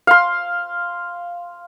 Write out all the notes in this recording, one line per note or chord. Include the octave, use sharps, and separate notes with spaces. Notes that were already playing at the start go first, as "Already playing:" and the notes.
F5 C6